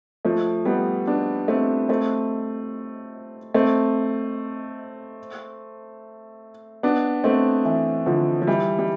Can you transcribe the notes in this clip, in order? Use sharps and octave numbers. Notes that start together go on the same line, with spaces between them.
F3 A3
G3 B3
B3 D4
A3 C4
A3 C4
A3 C4
B3 D4
A3 C4
E3
D3 F3
F3
E3 G3
G3